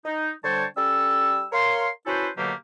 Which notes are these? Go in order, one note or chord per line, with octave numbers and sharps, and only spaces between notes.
D#4
D3 G3 C5 C#5 G5 A5
G3 C#4 A4 E6
A#4 C#5 F5 C6
C#4 E4 F#4 A4 B4 C5
B2 D3 F#3 A3 A#3 G4